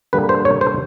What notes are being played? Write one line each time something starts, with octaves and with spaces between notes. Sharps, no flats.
D3 G3 A#3 B4
C5
C#5
C5